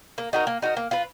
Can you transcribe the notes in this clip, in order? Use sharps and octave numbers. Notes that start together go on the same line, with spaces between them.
A#3
D#4 F#4 A#4
A#3
D#4 F#4 A#4
A#3
F4 B4